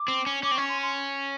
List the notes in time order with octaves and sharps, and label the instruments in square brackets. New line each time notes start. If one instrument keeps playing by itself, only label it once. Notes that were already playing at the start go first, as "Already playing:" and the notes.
Already playing: [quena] D6
[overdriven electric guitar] C4
C#4
[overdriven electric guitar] C#4 [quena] D6
[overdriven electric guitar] C4
[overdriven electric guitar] C#4 [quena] C#6
[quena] C6
C6